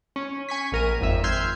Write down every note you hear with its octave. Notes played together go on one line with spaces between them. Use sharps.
C#4
G#5 C#6 B6
A#1 A#4 D#7
G#1 F2 E5
C6 E6 F6 G6 G#6 C7